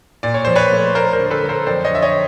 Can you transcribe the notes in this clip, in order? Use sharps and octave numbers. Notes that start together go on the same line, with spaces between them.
A#2 D5
C#5
F3 C5
B4 C#5
A3
A3 A#4 C5
A#4 C5
D3
A4 B4
F#3
A#4 C5
F2 C5 D5
C#5 D#5
D3 E5
C#5 D#5